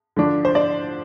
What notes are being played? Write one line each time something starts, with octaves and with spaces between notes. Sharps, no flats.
D3 F3 D4
C5
D5